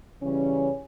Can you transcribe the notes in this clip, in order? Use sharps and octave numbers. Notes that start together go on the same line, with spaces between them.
C#3 E3 G3 C#4